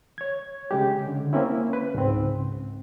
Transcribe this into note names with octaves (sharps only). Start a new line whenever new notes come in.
C#5 G#6
C#3 G#3 G4
D3
A#3 C4 C#4 E4
B4
C#2 G#2 C4